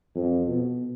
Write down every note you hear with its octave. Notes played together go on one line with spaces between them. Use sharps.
F2
B2